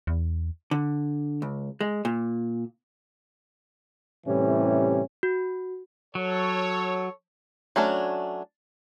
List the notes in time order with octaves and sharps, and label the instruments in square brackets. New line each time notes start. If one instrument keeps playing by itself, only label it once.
[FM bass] E2
[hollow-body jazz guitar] D3
C#2
G#3
A#2
[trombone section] A2 C3 E3 G3 C#4
[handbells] F#4
[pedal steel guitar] F#3 [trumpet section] A4 C#5
[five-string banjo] F#3 A3 C#4 D4